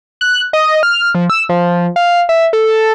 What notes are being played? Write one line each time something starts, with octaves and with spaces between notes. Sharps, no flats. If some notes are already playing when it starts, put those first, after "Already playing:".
F#6
D#5
F6
F3
E6
F3
F5
E5
A4